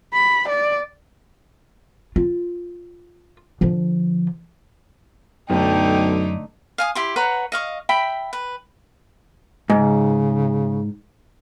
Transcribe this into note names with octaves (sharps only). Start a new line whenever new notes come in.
B5
D5
F4
D3 F3
B1 F#2 D3 A3 D#4 G5
F5 G#5 D#6
E4 G4 C6
B4 C#5 F#5 A#5
D#5 F5 C#6
E5 G5 B5
B4
G#2 C#3